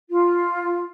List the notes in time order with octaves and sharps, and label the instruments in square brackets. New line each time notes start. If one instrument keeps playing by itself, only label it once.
[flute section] F4